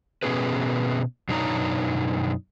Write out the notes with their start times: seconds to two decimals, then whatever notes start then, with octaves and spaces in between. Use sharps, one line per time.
0.23 B2 B3 C#4 G4 G#4 B4
1.29 F#2 B2 D4 D#4 C#5 A#5